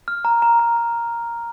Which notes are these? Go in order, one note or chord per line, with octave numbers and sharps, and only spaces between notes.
F6
A#5
A#5
A#5
A#5